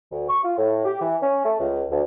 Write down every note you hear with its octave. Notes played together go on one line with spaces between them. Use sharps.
D2
C#6
F4
A2
G4
E3
C#4
A3
C#2
D2